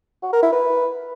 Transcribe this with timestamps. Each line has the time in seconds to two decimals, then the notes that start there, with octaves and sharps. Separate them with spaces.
0.23 F#4
0.33 A#4
0.43 E4
0.53 B4